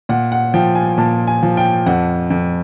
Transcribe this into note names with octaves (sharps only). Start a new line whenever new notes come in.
A#2 F#5
F#5
F3 G5
G#5
A#2 A5
G#5
F3
G5
F2 F#5
F2